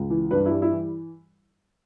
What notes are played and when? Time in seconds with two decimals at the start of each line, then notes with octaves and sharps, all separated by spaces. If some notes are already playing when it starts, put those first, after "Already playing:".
Already playing: C#2
0.10 E3
0.31 G2 B4
0.46 E4
0.51 G3
0.62 E4
0.72 E3